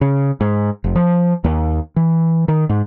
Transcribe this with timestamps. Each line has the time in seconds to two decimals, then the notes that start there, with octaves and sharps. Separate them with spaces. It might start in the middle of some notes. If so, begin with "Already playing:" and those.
0.01 C#3
0.41 G#2
0.84 F1
0.95 F3
1.44 D#2
1.96 E3
2.48 D#3
2.69 G#2